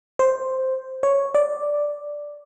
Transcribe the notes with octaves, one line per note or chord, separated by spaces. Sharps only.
C5
C#5
D5